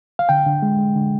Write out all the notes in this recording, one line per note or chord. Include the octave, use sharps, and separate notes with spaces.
F5
D3 G5
D3
G#3
G#3
D3